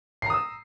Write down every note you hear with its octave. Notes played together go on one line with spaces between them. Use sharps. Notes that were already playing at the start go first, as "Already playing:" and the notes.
A#5 D#6 E6 C7